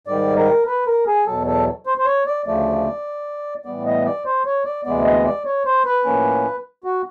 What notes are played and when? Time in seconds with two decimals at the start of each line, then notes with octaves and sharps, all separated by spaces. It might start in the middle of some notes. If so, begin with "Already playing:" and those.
0.07 G#2 D#3 G3 D5
0.37 A#4
0.67 B4
0.87 A#4
1.07 G#4
1.27 E2 B2 F#3 A4
1.47 A4
1.86 C5
1.98 C5
2.06 C#5
2.26 D5
2.46 D2 C#3 F3 A3 D5
3.65 A2 E3 G3 B3 D5
3.86 D#5
4.06 D5
4.25 C5
4.45 C#5
4.65 D5
4.85 D2 C3 E3 G#3 B3 D5
5.05 D#5
5.25 D5
5.45 C#5
5.65 C5
5.85 B4
6.05 A2 F3 A#3 C#4
6.84 F#4